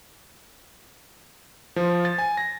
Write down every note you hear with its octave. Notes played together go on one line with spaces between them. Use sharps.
F3
A6
G#5
A#6